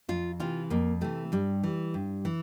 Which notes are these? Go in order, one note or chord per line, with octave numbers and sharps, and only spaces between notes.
F2 F4
C3 E3 F4
F2 A#3
C3 E3 A3
G2 G3
E3
G2
E3